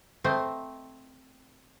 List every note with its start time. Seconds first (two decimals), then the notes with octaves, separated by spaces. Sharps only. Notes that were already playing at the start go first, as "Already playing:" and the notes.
0.24 A3 C4 D#5